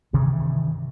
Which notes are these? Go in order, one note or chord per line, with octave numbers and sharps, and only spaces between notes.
G2 C3 D#3 E3